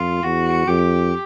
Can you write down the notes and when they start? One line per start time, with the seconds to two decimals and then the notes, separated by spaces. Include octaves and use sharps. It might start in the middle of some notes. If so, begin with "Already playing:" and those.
Already playing: F2 F4
0.23 E2 F#4
0.67 F2 G4